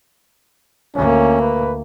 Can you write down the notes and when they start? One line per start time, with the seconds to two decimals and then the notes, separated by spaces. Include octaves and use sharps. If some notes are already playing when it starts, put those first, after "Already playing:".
0.95 D2 A#3 C#4
1.41 B4